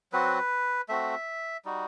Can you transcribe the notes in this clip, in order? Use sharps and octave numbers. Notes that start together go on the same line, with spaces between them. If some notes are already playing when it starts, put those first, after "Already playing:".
F#3 C4 F#4 B4
A3 C4 F#4 E5
G3 D#4 F#4